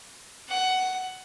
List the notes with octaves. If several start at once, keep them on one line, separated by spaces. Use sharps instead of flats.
F#5